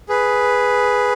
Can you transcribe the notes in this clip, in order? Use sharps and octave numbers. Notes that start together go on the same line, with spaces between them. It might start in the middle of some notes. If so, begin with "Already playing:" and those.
G#4 B4